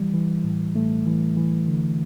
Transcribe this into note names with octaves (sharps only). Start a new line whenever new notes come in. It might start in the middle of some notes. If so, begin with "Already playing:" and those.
Already playing: E3 G3
E3
A2
A2 A3
E3
E3
D3